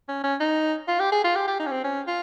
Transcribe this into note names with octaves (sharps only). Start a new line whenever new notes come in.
C#4
C#4
D#4
F4
G4
G#4
F4
G4
G4
D#4
C#4
C4
C#4
F4